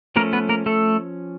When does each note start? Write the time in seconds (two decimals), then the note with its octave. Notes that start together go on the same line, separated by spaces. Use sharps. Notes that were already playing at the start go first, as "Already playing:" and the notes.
0.16 F3 A3 A#3 C#4 A#4
0.33 B3 B4
0.49 A#3 A#4
0.66 A3 A4